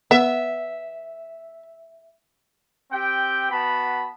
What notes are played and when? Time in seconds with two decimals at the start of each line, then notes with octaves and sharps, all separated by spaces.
0.11 B3 E5
2.92 C4 G4 G5
3.51 B3 F#4 A5 B5